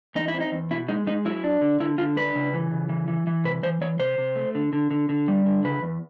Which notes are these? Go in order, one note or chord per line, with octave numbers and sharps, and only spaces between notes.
E2 D#4
E4
C4
D#4
E2
B2 E4
G#3 D#4
G#3 D#4
F#3 E4
D4
D3
D3 E4
D3 F4
D4 B4
C#3
E3
C#3
E3
E3
E3
C3 B4
E3 C5
E3 C#5
C3 C5
C3
A3
D3
D3
D3
D3
G3
D3
C#3 B4
E2